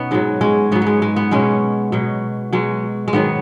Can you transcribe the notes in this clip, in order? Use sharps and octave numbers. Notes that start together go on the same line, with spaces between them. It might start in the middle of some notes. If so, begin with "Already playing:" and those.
Already playing: B2 B3 C#4 D#4
G#2 F#3 G#3
G#3 C#4
G#2 F#3 B3
G#3 B3
G#3
B3
B2 F#3 G#3 C#4
B2 F#3
B2 F#3 G#3
G#3
G#2 D#3 F#3 B3